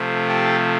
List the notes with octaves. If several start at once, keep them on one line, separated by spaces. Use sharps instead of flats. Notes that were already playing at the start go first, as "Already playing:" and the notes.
Already playing: C3 F3 A3
G4 A4